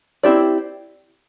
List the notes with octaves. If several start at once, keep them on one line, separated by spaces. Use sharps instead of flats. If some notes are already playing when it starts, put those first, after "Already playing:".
C4 E4 G4 D5